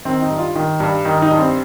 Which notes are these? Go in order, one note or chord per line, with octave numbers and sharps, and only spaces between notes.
D#3 C4
D#4
G2
F4
D#3
G2
D#3 D#4
D#4
G2
C4